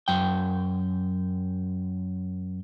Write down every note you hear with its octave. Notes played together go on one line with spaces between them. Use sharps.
F#2 G5